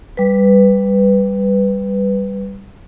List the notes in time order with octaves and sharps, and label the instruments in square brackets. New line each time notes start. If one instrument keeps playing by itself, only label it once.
[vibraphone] G3 B4